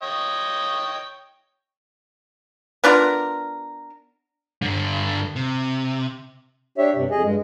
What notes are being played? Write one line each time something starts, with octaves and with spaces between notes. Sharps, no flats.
C#5 D#5 G5
B3 D4 F4 A#4
G2 D3
C3
D4 G4 C#5 E5
G2 C3
F2 G#4 D#5
G2 G#3